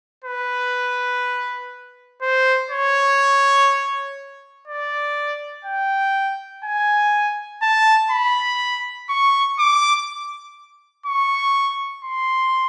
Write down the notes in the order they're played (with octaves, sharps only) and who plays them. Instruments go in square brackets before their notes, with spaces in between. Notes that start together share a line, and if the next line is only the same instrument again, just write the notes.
[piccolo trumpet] B4
C5
C#5
D5
G5
G#5
A5
B5
C#6
D6
C#6
C6